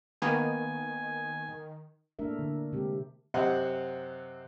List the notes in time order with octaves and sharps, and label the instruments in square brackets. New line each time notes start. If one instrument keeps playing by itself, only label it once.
[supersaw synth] D#3 [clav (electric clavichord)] A#3 B3 [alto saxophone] G#5
[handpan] A3 A#3 D4 A#4 E5
D3
C3 G#3 C4 G4
[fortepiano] F#2 C3 C4 D#5 F#5 F#6